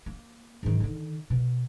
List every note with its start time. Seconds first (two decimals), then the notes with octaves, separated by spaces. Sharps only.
0.06 A#3
0.63 G#2 D#3
0.80 D3 D#3
1.30 B2